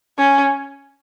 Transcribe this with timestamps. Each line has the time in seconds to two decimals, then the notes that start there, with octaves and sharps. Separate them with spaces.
0.18 C#4